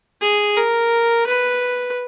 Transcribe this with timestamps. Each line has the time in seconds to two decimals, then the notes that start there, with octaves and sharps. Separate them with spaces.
0.21 G#4
0.57 A#4
1.26 B4